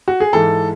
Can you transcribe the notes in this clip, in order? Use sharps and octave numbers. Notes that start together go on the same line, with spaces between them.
F#4
G#4
G#2 E3 A4